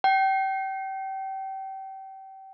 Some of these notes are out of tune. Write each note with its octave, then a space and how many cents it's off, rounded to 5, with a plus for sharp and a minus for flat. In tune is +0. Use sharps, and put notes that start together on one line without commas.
G5 -30